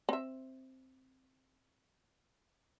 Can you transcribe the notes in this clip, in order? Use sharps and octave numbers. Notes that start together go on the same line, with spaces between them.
C4 E5